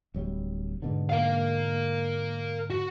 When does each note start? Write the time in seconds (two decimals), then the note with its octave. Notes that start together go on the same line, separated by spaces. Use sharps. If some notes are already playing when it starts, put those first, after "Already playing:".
0.14 D1 F#3 G3
0.82 G#2 B2 D3
1.10 A#4 F5
2.70 F#4